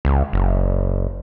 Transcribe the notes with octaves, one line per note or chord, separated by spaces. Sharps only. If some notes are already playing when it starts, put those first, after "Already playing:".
C#2
F#1